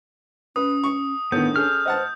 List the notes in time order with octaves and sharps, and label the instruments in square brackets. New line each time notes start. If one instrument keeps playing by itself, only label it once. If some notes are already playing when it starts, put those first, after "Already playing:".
[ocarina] C#4 [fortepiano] B4 [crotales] D#6
[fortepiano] C#6
[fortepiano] A2 D#3 [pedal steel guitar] B3 [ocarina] D4 [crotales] G6
[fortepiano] C#4 G#4 A4 [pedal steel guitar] F6
[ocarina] C5 [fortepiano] D#5 F#5 A5